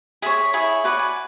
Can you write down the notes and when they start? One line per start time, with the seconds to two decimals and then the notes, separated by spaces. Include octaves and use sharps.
0.22 G#4 C#5 E5
0.53 E4 G#4 C#5
0.84 F#4 B4 D5
0.99 G#5